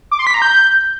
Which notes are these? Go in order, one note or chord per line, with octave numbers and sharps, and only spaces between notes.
D6
C6
B6
A#5
G6